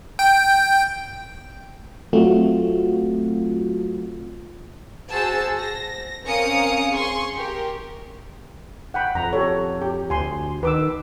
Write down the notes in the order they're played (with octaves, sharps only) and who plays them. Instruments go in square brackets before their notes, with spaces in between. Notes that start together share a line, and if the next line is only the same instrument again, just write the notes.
[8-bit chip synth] G5
[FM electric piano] F#3 A3 C4 F4 F#4
[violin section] F#4 G#4 C5 A5 E6
A#6
C4 C#4 A#4 F5 D#6 C#7
G#4 C6 C#6
G4 A#4
[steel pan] F#5 G5 B5
[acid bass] F2 [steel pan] A#5
[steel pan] G4 A4 C#5
G4
[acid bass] D2 [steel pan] G#5 C6
[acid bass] D#3 [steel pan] B4 D6 E6